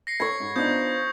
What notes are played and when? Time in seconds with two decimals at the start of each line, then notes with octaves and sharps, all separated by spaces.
0.07 A#6 C7 C#7
0.20 A4 C#5 B5 G#6
0.40 G#2
0.56 F3 B3 D4 D#4 D#6 G6